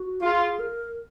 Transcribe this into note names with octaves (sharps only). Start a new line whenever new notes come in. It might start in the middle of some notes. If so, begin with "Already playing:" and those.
Already playing: F#4
F4 G#4
A#4